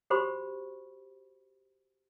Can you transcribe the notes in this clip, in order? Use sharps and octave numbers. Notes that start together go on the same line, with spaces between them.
F#4 G4 C5 B5 C#6